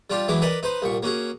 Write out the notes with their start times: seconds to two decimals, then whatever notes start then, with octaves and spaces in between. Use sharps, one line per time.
0.10 G3 D4 F4 G4
0.28 E3 F#3 G#3 E4 D6
0.42 A#4 B4 D5 D#5 B5
0.63 D#4 B4 C5
0.82 C2 A#2 C#6
1.03 A#3 C#4 F#4 G#4